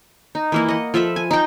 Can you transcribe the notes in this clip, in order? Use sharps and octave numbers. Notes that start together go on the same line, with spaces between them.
D#4
E3 A#3 E4
D#5 F#5
F3 A4 E5 B5
G#5
D#4 G5